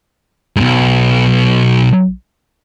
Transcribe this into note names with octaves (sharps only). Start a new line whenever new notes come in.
B1 G#2